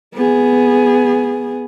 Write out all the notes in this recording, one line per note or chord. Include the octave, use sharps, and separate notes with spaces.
B3 G#4